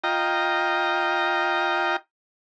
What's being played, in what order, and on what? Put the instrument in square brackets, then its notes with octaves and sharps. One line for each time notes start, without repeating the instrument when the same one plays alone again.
[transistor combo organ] F4 D#5 G5 A#5